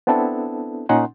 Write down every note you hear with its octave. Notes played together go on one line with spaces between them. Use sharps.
B3 C4 D4 E4 A4
A#2 C#4 D#4 F#5 C6